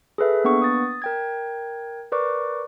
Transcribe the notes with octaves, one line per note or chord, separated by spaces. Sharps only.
G#4 A4 B4 E5
A#3 B3 D4 B4 C#6
D#6 A6
A#4 G5 G#6
A#4 B4 D5 C#6 D6